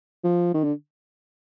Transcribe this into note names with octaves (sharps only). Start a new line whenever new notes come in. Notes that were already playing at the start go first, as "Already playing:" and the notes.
F3
D#3
D3